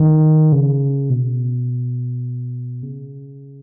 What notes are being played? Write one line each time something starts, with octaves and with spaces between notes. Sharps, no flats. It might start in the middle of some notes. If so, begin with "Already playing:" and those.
Already playing: D#3
C#3
B2
C#3